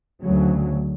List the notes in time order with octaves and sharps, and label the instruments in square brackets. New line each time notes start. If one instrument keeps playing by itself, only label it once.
[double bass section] D2 C#3 F#3